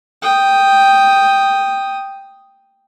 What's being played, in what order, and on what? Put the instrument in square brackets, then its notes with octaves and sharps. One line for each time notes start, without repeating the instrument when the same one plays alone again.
[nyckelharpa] G5 D#6